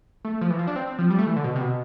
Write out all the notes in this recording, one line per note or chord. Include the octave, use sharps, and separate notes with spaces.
A3
F3
E3
F3
D4
C4
C4
F3
G3
A3
E3
D3
B2
C3
B2